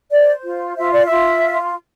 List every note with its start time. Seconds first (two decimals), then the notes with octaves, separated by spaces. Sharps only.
0.11 C5 D5
0.45 F4
0.77 F4 E5
0.91 D5
1.05 E5
1.11 F4